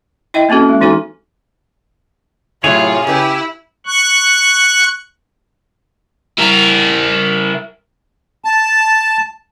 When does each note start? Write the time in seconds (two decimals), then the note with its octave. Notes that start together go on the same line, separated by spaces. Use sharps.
0.34 E4 D#5 E5 G5
0.49 A#3 C4 C#4 F#4 A4
0.69 G#3
0.81 E3 D#4 F#4 A4 G#5
2.64 A2 C3 F#3 A3 E4 F4 G#4 C#5
3.07 C#3 E4 G4 B4
3.86 C#6 F#6
6.38 E4 A#4
8.45 A5